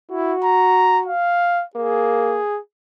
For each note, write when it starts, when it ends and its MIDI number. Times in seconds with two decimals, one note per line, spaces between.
0.11 0.34 64
0.11 1.11 66
0.44 1.00 82
1.06 1.64 77
1.75 2.40 58
1.75 2.60 68